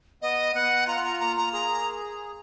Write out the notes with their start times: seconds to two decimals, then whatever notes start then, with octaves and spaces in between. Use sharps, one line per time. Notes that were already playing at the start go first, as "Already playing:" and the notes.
0.22 B3 D#5
0.55 B3 F#5
0.87 F4 A#5
1.04 A#5
1.20 A#3 A#5
1.37 A#5
1.53 G#4 A#5